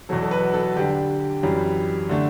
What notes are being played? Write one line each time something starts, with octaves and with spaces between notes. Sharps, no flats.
E2 B2 F#3 A4
A4
B4
A4
D3 G3 D4 G4
F#2 E3 G3
D3 A3 D4